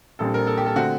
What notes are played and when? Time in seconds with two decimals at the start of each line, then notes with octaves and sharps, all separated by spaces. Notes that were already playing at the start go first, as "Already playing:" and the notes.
0.19 A#1 A#2 G3 C4 A4
0.34 A#4
0.47 A4
0.57 G4
0.66 A4
0.75 D3 A3 C4 F#4